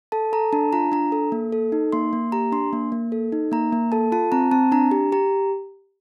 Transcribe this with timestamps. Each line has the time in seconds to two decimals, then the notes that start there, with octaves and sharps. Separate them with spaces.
0.12 A4 A5
0.33 A4 A#5
0.53 D4 A5
0.73 F4 A#5
0.92 D4 A#5
1.12 A4
1.32 A#3
1.52 A4
1.72 D#4
1.92 A#3 C6
2.13 A#3
2.32 G4 A#5
2.52 D4 C6
2.73 A#3
2.92 A#3
3.12 A4
3.32 D#4
3.52 A#3 A#5
3.73 A#3
3.92 A4 A5
4.12 F4 A5
4.32 C4 A#5
4.51 C4 A5
4.72 D4 A#5
4.91 G4
5.12 G4 A#5